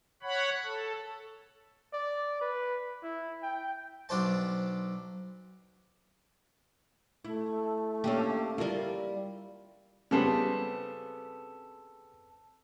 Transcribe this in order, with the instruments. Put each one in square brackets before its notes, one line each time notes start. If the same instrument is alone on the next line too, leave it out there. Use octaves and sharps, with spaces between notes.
[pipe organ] C#5 F#5 B5
A4
[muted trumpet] D5
B4
E4
G5
[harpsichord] B1 D4 C5 A5
[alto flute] A3 [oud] E4
[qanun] A#3 [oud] C#4 D4 G4
[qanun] G3 F4 [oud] E4 A#4
[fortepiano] C#3 G3 B3 [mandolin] C4 A4 B4